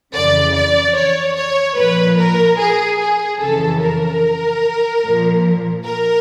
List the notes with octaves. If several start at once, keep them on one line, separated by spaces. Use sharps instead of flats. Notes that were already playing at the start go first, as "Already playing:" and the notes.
F2 C#3 E3 D5
D5
C#5
C#5
A#2 F3 B4
A#4
G#4
G#4
F2 C#3 E3 A4
A#4
A#2 F3
A#4